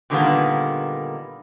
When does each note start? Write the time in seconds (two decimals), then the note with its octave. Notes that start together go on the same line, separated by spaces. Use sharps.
0.10 A#2 D3 D#3 G3 A#3 B3